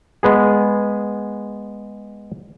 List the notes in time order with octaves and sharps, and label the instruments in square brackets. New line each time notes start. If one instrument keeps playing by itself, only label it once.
[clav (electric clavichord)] G#3 B3 G#4